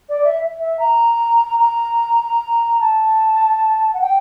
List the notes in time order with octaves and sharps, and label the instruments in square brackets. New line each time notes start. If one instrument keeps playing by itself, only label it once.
[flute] D5
E5
E5
A#5
A#5
A5
F#5
G5